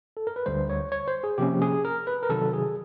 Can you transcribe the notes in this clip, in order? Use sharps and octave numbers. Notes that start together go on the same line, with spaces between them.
A4
A#4
B4
D2 D3 G3 C5
C#5
C#5
C5
G#4
C3 F3 A#3 C#4 G4
G#4
A#4
B4
A#4
C3 D#3 F#3 A4
G#4